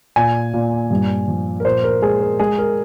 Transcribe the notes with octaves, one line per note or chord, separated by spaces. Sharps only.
A#2 G#5
A#2
G2
F3
A#4
A#2 C5
A#4
G#3 G#4
A#4
G#3 G#4
A#4